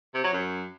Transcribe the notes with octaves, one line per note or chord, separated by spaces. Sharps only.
C3
F#3
F#2